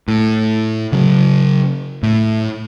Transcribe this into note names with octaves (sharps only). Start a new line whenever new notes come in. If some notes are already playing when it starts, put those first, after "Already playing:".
A2
C#3 F#3
A2